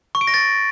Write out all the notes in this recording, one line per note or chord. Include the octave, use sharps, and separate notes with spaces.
C#6
D7
A#6
A6